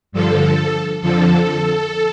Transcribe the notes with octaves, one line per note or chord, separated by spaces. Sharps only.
G2 D3 F3 A4
F2 D3 F3 A4